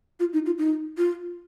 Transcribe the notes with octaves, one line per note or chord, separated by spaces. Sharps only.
F4
D#4
F4
D#4
F4